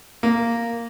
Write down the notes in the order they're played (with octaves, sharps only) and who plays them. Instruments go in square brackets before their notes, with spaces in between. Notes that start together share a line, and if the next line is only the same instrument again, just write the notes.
[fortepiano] A#3